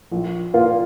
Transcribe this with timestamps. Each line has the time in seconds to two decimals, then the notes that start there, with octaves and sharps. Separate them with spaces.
0.11 A#1
0.54 A#2 A#3 F4